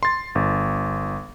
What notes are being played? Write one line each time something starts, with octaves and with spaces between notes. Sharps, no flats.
C6 A6
G1